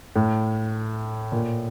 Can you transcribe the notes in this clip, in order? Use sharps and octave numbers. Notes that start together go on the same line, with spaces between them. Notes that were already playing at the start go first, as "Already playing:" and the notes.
A2
A#2